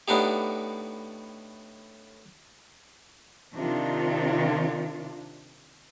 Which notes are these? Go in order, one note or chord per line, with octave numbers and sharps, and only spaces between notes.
A2 B3 D4 D#4 G4
C3 D#3 D4 F4